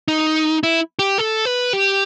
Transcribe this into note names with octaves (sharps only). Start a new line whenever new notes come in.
D#4
E4
G4
A4
B4
G4